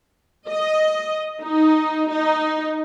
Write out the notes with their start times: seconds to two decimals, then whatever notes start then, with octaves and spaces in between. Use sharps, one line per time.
0.49 D#5
1.42 D#4
2.11 D#4